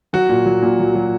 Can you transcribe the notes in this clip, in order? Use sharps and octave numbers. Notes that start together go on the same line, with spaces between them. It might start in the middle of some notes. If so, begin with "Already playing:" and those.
F#3 F#4
A#2
F#3
A#2
F#3
F#3